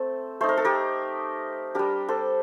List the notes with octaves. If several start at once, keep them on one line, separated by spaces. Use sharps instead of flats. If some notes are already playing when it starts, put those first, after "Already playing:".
Already playing: A3 C4 A4
A3 D#4 C5
A#4
A4
G4 A#4
G3 D4 G4 A#4
A4 C5